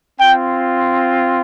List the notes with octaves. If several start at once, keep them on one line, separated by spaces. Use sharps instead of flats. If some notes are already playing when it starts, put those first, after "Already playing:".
C4 F4 G5